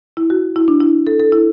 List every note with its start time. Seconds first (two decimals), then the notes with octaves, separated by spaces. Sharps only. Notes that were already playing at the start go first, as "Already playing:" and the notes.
0.17 E4
0.30 F#4
0.56 E4
0.68 D4
0.81 E4
1.07 A4
1.19 A4
1.32 E4